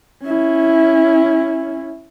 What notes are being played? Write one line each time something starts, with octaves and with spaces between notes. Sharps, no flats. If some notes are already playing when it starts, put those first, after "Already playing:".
C#4 E4